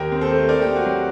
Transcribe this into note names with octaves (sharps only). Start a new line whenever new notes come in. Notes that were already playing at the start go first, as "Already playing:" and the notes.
Already playing: D#2 G4 A#4
C4
A4 C5
A3
C4 A#4 D5
C4 G4
F#4
F#3 G4